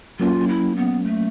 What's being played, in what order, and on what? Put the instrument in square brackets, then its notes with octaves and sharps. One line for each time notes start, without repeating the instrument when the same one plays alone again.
[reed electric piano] F#3 A#3 C#4 [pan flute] F4
[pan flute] E4
B3
A3